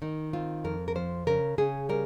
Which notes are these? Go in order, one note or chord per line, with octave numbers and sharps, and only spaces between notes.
D#3 D#4
C4 F4
F2 A#4
A#4
F3 C5
C#3 A#4
C#3 G#4
G3 A#4